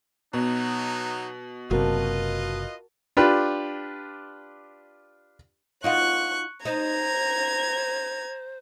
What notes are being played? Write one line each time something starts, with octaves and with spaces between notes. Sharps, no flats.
B2 F#3 B3 D#4
F#1 C3 F4 F#4 A#4 B4 D#5 A5
D4 F4 G4 B4
D#4 F4 F#4 C#6 F#6
D#4 C5 A#5 G#6